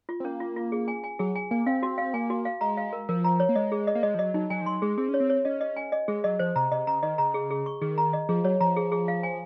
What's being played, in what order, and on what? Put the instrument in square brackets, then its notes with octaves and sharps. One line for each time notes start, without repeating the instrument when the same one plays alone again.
[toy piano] F4
[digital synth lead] C4
[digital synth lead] A#3 [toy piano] C#4
[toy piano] F4
F4
G#4
G#5
G#5
[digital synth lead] F#3 [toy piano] G#4
[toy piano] G#5
[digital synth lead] A#3 [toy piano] G#5
[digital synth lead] C4 [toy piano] F5
[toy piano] F#4
[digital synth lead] C4 [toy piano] F5
[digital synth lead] A#3 [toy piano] G#5
[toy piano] F#4
F5
[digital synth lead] G#3 [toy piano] A#5
[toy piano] F5
A#4
[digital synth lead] F3 [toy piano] A#4
[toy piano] A#5
C#5
[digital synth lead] A#3
[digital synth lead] G#3 [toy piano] D#5
[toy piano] G#4
D#5
[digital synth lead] A#3
[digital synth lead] G#3 [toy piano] D#5
[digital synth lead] F3
[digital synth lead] F#3 [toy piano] D#5
[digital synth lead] F#3 [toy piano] D#4
[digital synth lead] F#3 [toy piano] G#5
[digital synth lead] F3
[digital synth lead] F#3 [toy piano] C6
[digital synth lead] G#3 [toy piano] G#4
[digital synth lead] C4 [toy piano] G#4
[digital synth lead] C#4
[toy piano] C#5
[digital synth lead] C4
[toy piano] C#5
[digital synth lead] C#4 [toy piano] D#5
[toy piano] D#5
G#5
D#5
[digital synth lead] G#3 [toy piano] G#4
[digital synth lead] F#3 [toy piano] D#5
[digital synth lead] F3 [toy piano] C5
[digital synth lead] C3 [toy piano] A#5
[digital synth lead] C3 [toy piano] D#5
[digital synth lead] C#3 [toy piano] A#5
[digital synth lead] D#3 [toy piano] D#5
[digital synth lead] C#3 [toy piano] A#5
[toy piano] G#4
G#4
C#6
[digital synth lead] D#3 [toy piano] G#4
[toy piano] A#5
D#5
[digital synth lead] F3 [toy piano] G#4
[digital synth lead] F#3 [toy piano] C#5
[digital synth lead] F3 [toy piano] A#5
[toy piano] G#4
G#4
F5
G#5